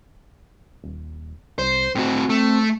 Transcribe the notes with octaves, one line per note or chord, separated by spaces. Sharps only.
D#1
C2 C5
A2 C4 F#4
A3